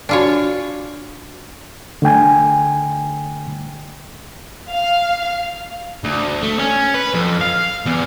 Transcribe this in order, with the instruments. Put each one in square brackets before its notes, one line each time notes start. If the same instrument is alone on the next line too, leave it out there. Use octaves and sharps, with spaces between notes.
[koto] D4 F4 C#5 [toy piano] F#4 G#5
[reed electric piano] D3 A3 G5 G#5
[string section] F5
[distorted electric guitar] D2
A3
C#4
B4
F2
F5
E2